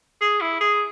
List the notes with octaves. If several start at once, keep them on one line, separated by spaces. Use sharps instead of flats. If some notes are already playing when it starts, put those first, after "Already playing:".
G#4
E4
G#4